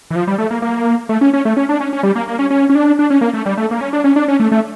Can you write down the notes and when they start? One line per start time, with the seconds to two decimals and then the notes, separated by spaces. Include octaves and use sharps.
0.10 E3
0.16 F3
0.27 G3
0.38 A3
0.50 A#3
0.62 A#3
1.09 A3
1.21 C#4
1.33 C#4
1.45 A3
1.57 C#4
1.69 D4
1.80 C#4
1.93 C#4
2.03 G3
2.16 A#3
2.28 A#3
2.39 C#4
2.50 C#4
2.69 C#4
2.75 D4
2.99 D4
3.10 C#4
3.21 A#3
3.34 A3
3.46 G3
3.57 A3
3.71 A#3
3.81 C#4
3.93 D4
4.04 C#4
4.16 D4
4.28 C#4
4.40 A3
4.52 A3